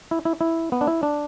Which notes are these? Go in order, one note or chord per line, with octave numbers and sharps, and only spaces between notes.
E4
E4
E4
B3
D4
E4
D4